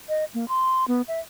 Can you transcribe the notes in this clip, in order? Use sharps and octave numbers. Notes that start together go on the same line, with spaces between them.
D#5
A#3
C6
B3
E5